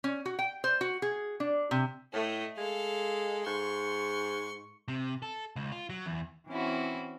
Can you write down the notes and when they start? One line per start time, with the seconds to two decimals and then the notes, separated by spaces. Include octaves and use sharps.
0.04 C#4
0.26 F#4
0.39 G5
0.64 C5
0.81 F#4
1.02 G#4
1.40 D4
1.71 C3
2.13 A2 A3 D#5
2.58 G#3 A4 F5
3.46 G#2 C6 C#6
4.88 C3
5.22 A4
5.56 C#2
5.72 F4
5.90 F#3
6.06 E2
6.49 E3 C4 C#4 E4 F#4